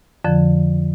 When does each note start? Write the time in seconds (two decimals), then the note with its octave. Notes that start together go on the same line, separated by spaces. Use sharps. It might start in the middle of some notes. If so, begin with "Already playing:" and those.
0.24 F2 D3 F3